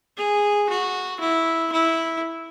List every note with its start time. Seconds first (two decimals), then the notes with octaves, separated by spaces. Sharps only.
0.17 G#4
0.69 F#4
1.20 E4
1.72 E4